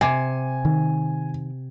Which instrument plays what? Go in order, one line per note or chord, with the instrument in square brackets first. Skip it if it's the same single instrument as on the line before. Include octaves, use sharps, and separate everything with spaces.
[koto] C3 [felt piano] G#5
[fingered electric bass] D#3